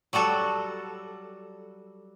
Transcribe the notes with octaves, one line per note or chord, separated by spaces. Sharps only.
F#3 G3 F#4 A4